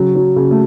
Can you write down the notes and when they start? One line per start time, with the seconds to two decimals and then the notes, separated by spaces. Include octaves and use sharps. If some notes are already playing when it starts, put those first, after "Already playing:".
Already playing: C#3 F#3 C#4
0.15 F#3
0.36 C#3
0.51 A3